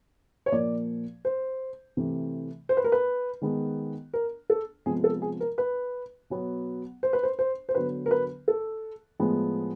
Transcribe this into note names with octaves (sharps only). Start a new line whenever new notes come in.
C#5
A#2 F3 A#3 D5
C5
C3 E3 A3
C5
B4
A#4
B4
D#3 G#3 B3
A#4
A4
C3 F3 G#3 B3 G#4
A4
G#4
A#4
B4
B2 F#3 B3
C5
B4
C5
C5
C5
D3 F#3 B3 B4
A#4
B4
A4
A2 F3 G#3 B3